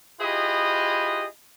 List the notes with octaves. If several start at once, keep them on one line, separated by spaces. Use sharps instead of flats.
E4 F4 G4 G#4 B4 D#5